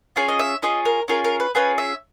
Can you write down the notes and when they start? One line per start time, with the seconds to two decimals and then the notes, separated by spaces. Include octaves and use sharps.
0.16 C#4 F4 G#4 F5
0.28 D#5
0.39 E5
0.62 C#4 F4 G#4 D#5
0.85 A#4
1.08 C#4 F4 G#4 A#4
1.24 A#4
1.40 B4
1.55 C#4 F4 G#4 B4
1.78 E5